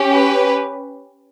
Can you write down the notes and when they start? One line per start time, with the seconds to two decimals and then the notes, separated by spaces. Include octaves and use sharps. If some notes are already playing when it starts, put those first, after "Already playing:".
Already playing: C#4 G4
0.13 B4